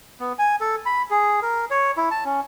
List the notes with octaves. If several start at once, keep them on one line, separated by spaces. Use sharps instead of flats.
B3
G#5
A4
B5
G#4
A#4
C#5
E4
A5
C#4